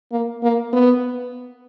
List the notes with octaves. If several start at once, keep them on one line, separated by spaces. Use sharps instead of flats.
A#3
A#3
B3